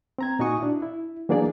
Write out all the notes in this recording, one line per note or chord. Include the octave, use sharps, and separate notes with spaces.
C4 A#5 G#6
A#2 D#4 F#4 G#5 C#6 D#6
D4 E4
E4
E3 F#3 A#3 D4 G#4 D5